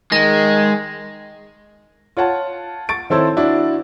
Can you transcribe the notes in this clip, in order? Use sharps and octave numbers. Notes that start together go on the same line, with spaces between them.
D#3 G#3 A#6
F4 C#5 F#5 A5
C#6 A6 D7
D#3 C4 E4 A4 C5 C#5
D4 E4 F#4